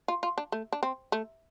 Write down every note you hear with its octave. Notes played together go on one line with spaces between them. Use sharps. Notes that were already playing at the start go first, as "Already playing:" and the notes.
F4
F4
D4
A3
D4
C4
A3